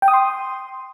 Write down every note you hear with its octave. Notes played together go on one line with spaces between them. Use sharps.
G5
D#6
C6